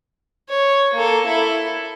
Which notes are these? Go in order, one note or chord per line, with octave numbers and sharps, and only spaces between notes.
C#5
A#3 A4
E4 A4